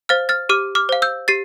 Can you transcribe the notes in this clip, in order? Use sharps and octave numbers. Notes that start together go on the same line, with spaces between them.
C5 F5 F6 A6
F6 A6
G4 D6 F6
D6 F6
C5 F5
E6 G6
G4 A6 C7